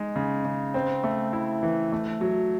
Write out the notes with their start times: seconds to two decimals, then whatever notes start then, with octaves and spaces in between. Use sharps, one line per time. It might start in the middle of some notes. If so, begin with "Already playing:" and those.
Already playing: G#3 D#4
0.16 C#3
0.45 C#3
0.74 C4
1.04 A3
1.33 E4
1.63 E3
1.92 A3
2.21 F#3